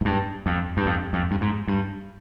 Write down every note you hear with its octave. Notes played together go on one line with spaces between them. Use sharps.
G#2
G2
F2
G2
F2
F2
G2
G#2
G2